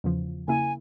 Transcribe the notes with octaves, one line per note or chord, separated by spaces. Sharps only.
E2 C#3 F3
C#3 A#3 E4 G#5